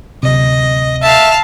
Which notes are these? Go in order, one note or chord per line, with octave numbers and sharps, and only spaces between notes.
D1 C3 D#5
E5 F5 A5